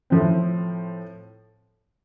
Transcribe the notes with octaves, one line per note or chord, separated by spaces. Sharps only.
A2 F3 C4